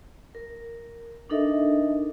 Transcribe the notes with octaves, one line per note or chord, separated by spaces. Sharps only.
A#4
D4 D#4 A4 A#4 D#5 E5